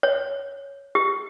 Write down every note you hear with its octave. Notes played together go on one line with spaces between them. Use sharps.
C#5
G4